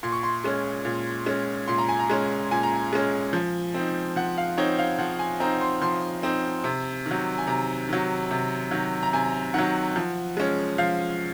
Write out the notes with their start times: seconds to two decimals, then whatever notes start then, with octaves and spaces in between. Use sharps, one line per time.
0.03 A#2 C6
0.12 C#6
0.23 C6
0.44 G#3 C#4
0.85 A#2
1.26 G#3 C#4
1.68 A#2 C6
1.78 A#5
1.89 G#5
1.99 A#5
2.09 G#3 C#4
2.51 A#2 G#5
2.63 A#5
2.75 G#5
2.93 G#3 C#4
3.33 F3
3.74 C4 D#4
4.16 F3 F#5
4.38 F5
4.58 C4 D#4 C#5
4.79 F5
4.99 F3 F#5
5.19 G#5
5.40 C4 D#4 A#5
5.61 C6
5.82 F3 C6
6.23 C4 D#4
6.64 C3
7.06 D#3
7.11 F#3
7.38 G#5
7.47 C3 A#5
7.89 D#3 F#3
8.31 C3
8.71 D#3 F#3
9.03 A#5
9.13 C3 G#5
9.54 D#3 F#3 F#5
9.96 F3
10.37 G#3 C#4
10.78 F3 F5